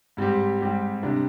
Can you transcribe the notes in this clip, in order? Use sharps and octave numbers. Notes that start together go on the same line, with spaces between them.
G#2 G3 C4 G4
G#2 G3 C4 G4
C3 G3 D4